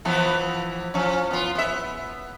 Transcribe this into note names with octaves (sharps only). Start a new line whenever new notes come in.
E3 F3 B3
F3 C#4
B3 F4
B3 E5